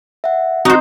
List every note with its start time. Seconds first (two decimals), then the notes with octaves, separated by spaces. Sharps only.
0.24 E5 F#5
0.65 C4 D#4 F#4 C5